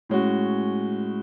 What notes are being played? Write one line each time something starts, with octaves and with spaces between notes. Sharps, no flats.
A2 G#3 C#4 F#4